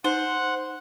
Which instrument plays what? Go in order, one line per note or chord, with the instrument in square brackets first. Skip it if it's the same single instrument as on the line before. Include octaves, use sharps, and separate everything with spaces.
[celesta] D#4 [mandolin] C5 [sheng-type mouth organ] F#5